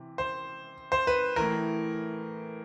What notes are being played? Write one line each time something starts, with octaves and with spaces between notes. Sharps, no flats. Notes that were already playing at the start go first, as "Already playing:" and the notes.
Already playing: C3 E3
C5
C5
B4
A2 E3 A#4